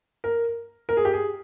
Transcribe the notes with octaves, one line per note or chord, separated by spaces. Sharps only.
A#4
A#4
G#4
G4
G#4